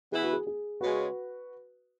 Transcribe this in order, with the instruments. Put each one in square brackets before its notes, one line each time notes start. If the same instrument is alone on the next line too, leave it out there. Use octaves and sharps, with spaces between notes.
[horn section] E3 B3 E4 B4 [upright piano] G#4
[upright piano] F#4
G#4
G#4
[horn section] C#3 G#3 C#4 [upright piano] F#4 B4